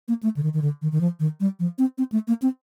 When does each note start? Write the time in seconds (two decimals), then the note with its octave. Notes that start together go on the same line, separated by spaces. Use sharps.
0.08 A#3
0.23 A3
0.36 D3
0.43 D#3
0.54 D#3
0.62 D3
0.82 D#3
0.92 D#3
1.01 F3
1.20 D#3
1.40 G3
1.60 F3
1.78 C4
1.98 C4
2.12 A3
2.28 A#3
2.42 C4